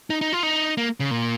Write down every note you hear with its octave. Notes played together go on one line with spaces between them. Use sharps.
D#4
D#4
F4
D#4
A#3
C#3
A#2